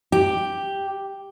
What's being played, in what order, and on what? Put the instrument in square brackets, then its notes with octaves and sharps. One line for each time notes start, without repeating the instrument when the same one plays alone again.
[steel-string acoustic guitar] G4